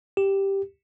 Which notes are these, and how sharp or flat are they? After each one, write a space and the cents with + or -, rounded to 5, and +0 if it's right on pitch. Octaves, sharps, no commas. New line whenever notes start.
G4 +0